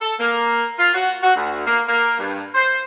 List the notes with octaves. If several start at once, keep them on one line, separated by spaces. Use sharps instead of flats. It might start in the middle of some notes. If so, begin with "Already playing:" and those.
A4
A#3
F4
F#4
F#4
D2
A#3
A#3
G2
C5